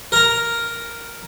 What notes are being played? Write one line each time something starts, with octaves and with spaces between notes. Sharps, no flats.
A#4 A#5